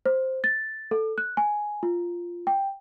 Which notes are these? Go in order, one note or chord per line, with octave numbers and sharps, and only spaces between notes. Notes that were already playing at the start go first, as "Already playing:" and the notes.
C5
A6
A4
F#6
G#5
F4
G5